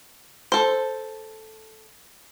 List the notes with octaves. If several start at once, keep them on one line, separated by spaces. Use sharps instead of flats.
A4 C5